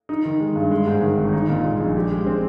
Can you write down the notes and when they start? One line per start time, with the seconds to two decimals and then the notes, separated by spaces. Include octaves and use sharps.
0.09 D#4
0.25 D#3
0.40 G#3
0.55 G2
0.71 G#3
0.87 G#2
1.02 D#3
1.17 G#1
1.33 D#4
1.49 A#2
1.64 G#3
1.81 A#1
1.96 G4
2.12 G#3
2.26 C4